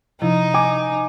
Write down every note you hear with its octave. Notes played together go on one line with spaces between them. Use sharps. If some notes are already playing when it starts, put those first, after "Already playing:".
C3 F3 D#4 E4
G#5 D6